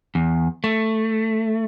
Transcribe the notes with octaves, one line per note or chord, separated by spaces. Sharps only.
E2
A3